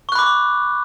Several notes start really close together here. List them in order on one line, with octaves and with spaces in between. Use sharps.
C#6 F#6 B5 D6